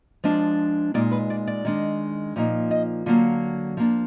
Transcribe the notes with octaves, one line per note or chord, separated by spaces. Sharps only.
F3 G#3 D4
A#2 G#3 D#4 D5
B4
D5
D5
D#3 G#3 D4
A#2 F3 A#3 D#4
D#5
D3 F#3 A#3 F4
F3 A#3 D4